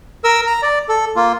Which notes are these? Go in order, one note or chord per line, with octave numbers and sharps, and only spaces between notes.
A#4 E6
A#5
D5
A4
A#3 F4